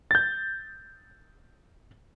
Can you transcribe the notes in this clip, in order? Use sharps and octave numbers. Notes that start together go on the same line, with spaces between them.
G6 A6